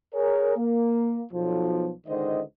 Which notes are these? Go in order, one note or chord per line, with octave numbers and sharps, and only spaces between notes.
G#4 A#4 C#5
A#3
B1 F3
C#2 G#2 D3 D#3 C5 D#5